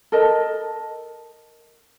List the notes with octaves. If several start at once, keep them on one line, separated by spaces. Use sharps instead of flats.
A4 A#4 D#5 A5